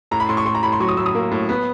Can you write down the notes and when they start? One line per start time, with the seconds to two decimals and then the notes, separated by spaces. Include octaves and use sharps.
0.11 A2 A#5
0.20 B5
0.29 A2 C6
0.37 C#6
0.45 A2 C6
0.55 A#5
0.63 A2 B5
0.72 C6
0.80 F#3 C#6
0.88 D#6
0.97 A2 E6
1.06 D#6
1.15 A#3
1.31 A2
1.49 B3